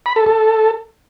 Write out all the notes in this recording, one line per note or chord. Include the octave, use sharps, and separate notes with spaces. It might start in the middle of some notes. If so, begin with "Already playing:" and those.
B5
A4
A4